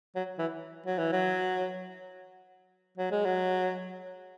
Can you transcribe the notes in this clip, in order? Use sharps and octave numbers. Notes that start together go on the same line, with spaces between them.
F#3
E3
F#3
E3
F#3
F#3
G#3
F#3